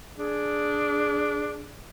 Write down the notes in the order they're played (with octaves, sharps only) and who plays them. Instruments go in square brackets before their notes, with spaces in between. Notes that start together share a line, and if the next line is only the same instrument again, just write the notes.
[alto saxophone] D4 [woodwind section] G#4